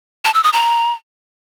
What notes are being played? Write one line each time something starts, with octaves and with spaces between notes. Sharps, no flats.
A5
E6
D#6
A#5